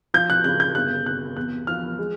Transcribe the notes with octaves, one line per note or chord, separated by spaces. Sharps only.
F3 G6
F#6
C#3 F#6
G6
G1 F#6
C3 F#6
E2 F#6
F3 F6
G#3